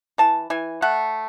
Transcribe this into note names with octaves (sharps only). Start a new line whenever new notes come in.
E3 A5
E3 G#5
A3 F#5